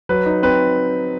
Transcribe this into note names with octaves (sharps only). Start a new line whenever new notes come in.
F#3 B4
D#4
C4 B4